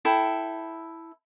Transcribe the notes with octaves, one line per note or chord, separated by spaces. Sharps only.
E4 A4 G5